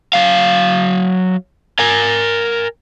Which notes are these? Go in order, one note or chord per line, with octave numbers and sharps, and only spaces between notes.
F#3 F5
A#4 G#5